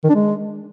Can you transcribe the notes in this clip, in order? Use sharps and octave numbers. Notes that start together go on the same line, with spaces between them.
D#3
D4
G#3